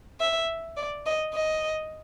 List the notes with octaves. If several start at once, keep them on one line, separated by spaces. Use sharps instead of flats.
E5
D5
D#5
D#5